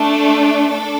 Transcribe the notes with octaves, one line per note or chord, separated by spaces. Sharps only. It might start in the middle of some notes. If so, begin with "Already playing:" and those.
Already playing: A3 D4 A4
D4 A4